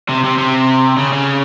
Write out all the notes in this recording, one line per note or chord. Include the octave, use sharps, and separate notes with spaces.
C3
C3
C3
C#3
C#3